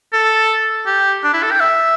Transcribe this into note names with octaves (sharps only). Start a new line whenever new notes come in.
A4
G4
D4
E4
A4
G5
E5